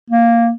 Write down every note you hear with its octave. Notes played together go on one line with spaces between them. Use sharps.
A#3